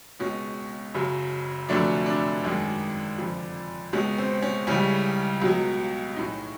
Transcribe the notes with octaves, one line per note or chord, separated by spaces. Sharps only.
C#2 B2 G#3 C#4
F#1 F#2 C#3 F#3
F1 F2 D3 F#3 A3 D4
D4
G#1 F#2 D#3 G#3
F1 F2 D3 F3
C#2 B2 G#3 C#4
C4
C#4
C#2 C#3 E3 G3 C#4
C#2 B2 F#3
B1 A2 E3 D#4